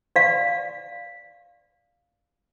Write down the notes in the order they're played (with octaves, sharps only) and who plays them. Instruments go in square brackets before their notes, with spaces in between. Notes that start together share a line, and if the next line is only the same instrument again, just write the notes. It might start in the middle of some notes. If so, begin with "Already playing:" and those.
[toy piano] D5 F5